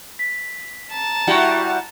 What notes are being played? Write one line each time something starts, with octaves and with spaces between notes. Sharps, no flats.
B6
A5 A#5
G3 E4 F#4 G5 C#6